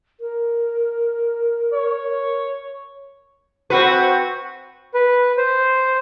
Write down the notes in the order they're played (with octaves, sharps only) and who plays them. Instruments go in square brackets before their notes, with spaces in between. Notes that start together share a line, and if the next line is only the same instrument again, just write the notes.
[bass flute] A#4
[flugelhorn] C#5
[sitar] C4 F#4 B4
[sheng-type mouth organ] B4
C5